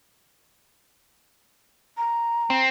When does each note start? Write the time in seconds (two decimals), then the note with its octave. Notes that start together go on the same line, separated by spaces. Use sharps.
1.97 A#5
2.50 C4